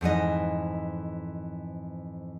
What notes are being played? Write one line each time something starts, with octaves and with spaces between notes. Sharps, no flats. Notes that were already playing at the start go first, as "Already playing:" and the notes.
F2 G#2 E3 D#5